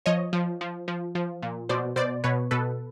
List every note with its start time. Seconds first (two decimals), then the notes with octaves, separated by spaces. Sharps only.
0.06 F3 C#5 D#5
0.33 F3
0.61 F3
0.88 F3
1.15 F3
1.42 A#2
1.69 B2 C5 D5
1.96 B2 C5 D5
2.24 B2 B4 C#5
2.51 B2 A4 B4